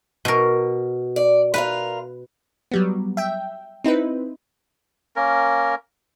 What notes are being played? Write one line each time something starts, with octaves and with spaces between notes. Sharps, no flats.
B2 A#4
D5
F4 A#4 B4 F5
F#3 G3 B3
E5 G5
C4 D#4 E4 B4
A#3 C#4 A#4